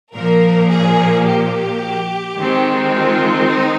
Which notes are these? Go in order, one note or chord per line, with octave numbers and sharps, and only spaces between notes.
A#2 F3 A#3 A#4
G#4
G4
D#3 G#3 C4
F4
D#4